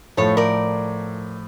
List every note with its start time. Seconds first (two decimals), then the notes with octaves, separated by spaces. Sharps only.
0.17 A2 F3 A3 A4 C#5
0.37 A#4 D5